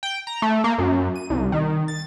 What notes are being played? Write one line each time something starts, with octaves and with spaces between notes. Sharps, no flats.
G5
A#5
A3
A#3
F#2
D#7
C2
D#3
A6